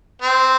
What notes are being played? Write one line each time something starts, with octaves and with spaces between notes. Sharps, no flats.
C4